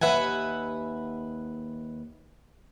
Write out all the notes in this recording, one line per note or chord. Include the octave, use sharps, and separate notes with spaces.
D#2 C3 B4 E5 F#5 G#5